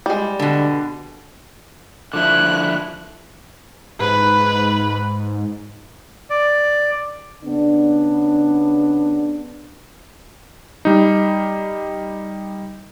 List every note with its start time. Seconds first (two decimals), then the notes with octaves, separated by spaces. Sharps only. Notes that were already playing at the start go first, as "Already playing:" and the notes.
0.06 G3 G#3
0.40 B2 D3
2.13 D3 F3 E4 F#6
4.00 G#2 B4
6.30 D5
7.44 C#3 B3 D4
10.85 G3 D#4